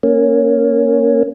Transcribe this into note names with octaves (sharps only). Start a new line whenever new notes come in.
A#3 C#4